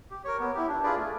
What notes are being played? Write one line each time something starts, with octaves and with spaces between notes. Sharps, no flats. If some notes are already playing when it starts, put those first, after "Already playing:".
G4
A#4 C#5
B3
E4 G4
D4
F4 G#4 B4 D5
A3